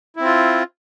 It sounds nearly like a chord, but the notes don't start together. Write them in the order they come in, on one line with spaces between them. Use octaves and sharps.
E4 C4 F4